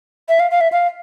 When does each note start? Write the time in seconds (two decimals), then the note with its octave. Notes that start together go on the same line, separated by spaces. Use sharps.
0.29 E5
0.40 F5
0.51 F5
0.61 E5
0.72 F5